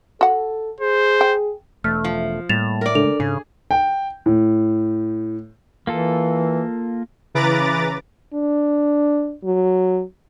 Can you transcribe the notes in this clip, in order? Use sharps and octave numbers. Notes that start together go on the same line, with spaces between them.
F#4 A4 F#5
G#4 C5
G5
E1 A3 F6
F3
A2 G3 A#3 A6 E7 F7
A#4 D5
C#3 G#3 A3 D4 A4 F7
G#2 C#3 G#4
G5
A2
E3 A#3 F4 A4
C#3 E3 B4 A#5 D6 A6
D4
F#3